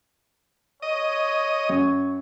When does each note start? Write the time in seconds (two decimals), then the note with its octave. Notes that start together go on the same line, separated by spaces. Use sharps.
0.82 C#5 D#5
1.69 F#2